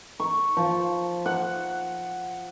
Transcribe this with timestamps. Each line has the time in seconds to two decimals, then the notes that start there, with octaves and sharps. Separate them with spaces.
0.20 C#6
0.57 F3
1.26 F#5